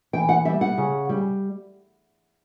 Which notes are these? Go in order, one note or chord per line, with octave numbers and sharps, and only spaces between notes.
E3 G5
F#5
G3 E5
F#5
C#3
G3